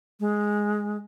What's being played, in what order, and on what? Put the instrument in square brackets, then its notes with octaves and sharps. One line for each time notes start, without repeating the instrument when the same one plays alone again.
[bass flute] G#3